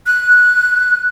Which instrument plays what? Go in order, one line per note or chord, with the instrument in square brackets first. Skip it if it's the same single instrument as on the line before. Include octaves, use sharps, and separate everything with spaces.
[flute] F#6